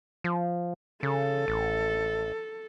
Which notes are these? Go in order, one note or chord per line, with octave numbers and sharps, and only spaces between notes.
F3
C#3 A4
A1